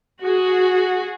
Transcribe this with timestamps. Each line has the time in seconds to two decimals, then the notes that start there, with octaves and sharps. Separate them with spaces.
0.21 F#4 G#4